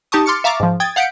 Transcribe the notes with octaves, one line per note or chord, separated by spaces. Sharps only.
D#4 G4 A5 C#6 D#6
C6 D6 F6 A6 C#7
E5 F5 A#5 C#6 D6 A6
G#2 F3
G5 D#6 G#6 A6
F5 F#5 G6 B6 C#7 D7